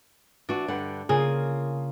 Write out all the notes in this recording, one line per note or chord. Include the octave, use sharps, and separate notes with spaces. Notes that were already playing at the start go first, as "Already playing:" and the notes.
E3 D4 F#4
G2 D3 F#5
C#3 A#3 F4 G#4